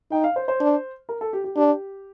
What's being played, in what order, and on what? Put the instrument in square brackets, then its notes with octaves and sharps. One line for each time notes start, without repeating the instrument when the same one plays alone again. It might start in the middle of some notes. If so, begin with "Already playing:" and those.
[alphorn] D#4 [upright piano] G5
[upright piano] F5
C5
C5
[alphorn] D4
[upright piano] A#4
A4
G4
G4
[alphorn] D4 [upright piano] G4